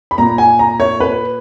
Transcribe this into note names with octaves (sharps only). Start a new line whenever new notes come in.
B5
A#2 A#5
G#5
A#5
C#5
B4